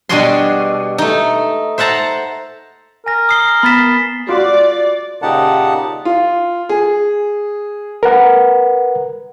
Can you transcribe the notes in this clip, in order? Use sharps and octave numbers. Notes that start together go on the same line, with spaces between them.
B2 G3 D4 F#4 G#4 C6
A3 D#4
C5 E5 F#5 A5 A#5
A#4 G#5 A#6
D#6 C7 G7
B3 B5 A6 B6 E7
F4 F#4 D5
A#2 C#3 D#4 G4 F#5 A5
F4
G#4
A#4 B4 F#5